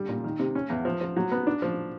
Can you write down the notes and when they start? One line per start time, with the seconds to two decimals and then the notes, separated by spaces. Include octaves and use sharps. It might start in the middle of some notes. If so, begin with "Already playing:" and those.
Already playing: D3 G3
0.09 A#2
0.24 D#3
0.39 C3
0.55 C#4
0.70 E2
0.85 F3
1.01 F3
1.17 F#3
1.32 B3
1.47 D4
1.62 F3